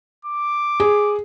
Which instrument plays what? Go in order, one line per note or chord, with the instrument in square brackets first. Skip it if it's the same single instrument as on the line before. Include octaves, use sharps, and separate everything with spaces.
[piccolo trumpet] D6
[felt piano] G#4